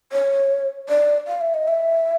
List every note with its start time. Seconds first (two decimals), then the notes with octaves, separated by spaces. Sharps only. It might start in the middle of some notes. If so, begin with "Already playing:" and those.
0.12 C#5
0.89 D5
1.27 F5
1.41 E5
1.54 D#5
1.68 E5